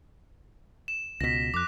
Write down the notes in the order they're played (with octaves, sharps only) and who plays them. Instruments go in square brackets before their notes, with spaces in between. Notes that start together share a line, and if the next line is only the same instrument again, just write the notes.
[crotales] E7
[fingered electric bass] C#2 B2 [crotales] A#6 B6
[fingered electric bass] F2 [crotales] D6 F#6